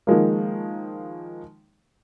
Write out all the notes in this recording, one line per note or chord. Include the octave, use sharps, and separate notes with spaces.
D#3 F3 G#3 A#3